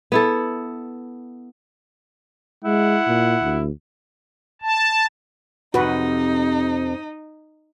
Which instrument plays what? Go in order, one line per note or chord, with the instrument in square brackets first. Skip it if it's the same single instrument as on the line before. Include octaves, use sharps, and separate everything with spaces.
[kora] B3 E4 A4
[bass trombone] G#3 [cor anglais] E4 [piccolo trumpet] F#5
[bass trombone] A#2
D2
[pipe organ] A5
[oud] F2 C3 [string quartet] D#4 [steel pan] F#4 B4